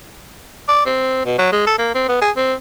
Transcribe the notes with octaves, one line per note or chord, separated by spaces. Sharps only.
D5
C4
B2
F#3
G#3
A4
A#3
C4
B3
G#4
C4